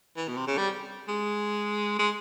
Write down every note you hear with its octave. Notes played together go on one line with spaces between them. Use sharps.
E3
B2
C3
C#3
G3
G#3
G#3